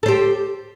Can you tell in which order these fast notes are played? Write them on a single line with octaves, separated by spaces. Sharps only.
A4 C5 G4